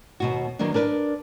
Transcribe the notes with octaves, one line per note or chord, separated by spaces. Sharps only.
D#2 B2 F#4
D#3 F#3 A#3 B3 D4
D4 A#4 B4 D5